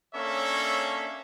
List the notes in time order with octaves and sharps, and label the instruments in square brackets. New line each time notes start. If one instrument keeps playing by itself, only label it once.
[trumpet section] A#3 C#4 D4 A4 C#5 E5